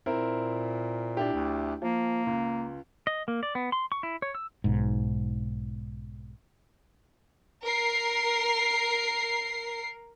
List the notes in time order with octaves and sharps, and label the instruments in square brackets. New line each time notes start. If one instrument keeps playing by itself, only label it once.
[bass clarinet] A#2 [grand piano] C4 E4 A#4
[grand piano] D4 E4 G4
[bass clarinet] D2
[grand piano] F3 [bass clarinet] A#3
[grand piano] C#2
[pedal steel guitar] D#5
A#3
D5
B3
C6
C#6
E4
C#5
E6
[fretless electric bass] B1 G#2
[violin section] A#4 C7